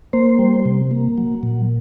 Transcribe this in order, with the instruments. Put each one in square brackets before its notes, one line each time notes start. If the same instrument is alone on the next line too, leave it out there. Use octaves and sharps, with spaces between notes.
[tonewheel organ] A#3 C5
G3
C3
A#3
F#3
A#2